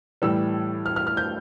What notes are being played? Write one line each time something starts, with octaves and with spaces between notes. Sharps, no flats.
A2 E3 G3 E6
F6
F6
F6
G6